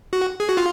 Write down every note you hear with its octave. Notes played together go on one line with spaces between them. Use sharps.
F#4
G#4
F#4
F4